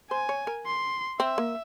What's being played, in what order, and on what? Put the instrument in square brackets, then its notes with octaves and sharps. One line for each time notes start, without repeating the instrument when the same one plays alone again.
[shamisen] C5 [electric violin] G#5
[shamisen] C#5
A#4
[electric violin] C6
[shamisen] C4 [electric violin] E5
[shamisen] A#3